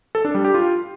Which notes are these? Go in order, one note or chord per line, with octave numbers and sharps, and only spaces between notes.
A4
D4
G3
G4
F4